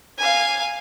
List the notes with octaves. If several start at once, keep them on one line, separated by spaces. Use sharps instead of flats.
F5 G#5